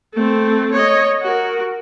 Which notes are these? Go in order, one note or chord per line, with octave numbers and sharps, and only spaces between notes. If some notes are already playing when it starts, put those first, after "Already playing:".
A3 C4
C#5 D#5
F#4 A#4